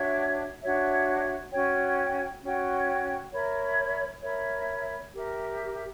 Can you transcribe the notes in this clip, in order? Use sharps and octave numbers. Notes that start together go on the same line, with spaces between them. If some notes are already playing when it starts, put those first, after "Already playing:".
Already playing: D4 F#4 C#5 E5
D4 F#4 C#5 E5
C#4 F#4 C#5 G5
C#4 F#4 C#5 G5
A#4 C#5 E5 B5
A#4 C#5 E5 B5
G4 A#4 E5